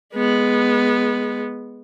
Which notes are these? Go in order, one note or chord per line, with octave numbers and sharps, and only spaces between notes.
G#3 B3